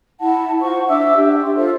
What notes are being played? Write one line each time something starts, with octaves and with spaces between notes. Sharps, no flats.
E4 F#5 A5
F4 C5 F#5 C#6
D4 E5 D6 E6
D4 G4
C6
F4 A4 C5 E5